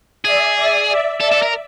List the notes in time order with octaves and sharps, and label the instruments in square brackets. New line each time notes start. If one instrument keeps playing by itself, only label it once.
[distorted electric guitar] G#4 [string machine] D5 E5
[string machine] D5 E5
D5 E5
[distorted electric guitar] A4 [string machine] D5 E5
[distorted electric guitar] A4
A#4